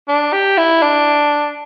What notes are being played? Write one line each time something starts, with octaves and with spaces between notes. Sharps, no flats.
D4
G4
E4
D4